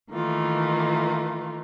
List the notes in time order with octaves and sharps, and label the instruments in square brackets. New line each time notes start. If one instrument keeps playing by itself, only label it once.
[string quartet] D#3 E3 A3 A#3 F4